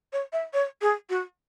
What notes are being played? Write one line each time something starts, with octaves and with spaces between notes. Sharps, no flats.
C#5
E5
C#5
G#4
F#4